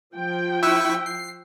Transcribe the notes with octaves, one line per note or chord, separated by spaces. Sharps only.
F3 G5
E4 C#6 E6 F#6 B6 D#7
C7